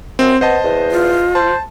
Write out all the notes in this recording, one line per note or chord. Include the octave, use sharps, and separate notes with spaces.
F#2 C4
B3 C5 D#5 A5
E2
F4
C5 A5